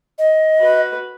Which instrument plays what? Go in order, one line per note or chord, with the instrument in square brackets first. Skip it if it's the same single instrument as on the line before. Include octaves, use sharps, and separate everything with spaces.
[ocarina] D#5
[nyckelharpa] F#4 B4